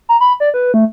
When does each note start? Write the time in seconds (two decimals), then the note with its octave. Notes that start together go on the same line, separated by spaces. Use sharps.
0.09 A#5
0.21 B5
0.40 D5
0.54 B4
0.74 A3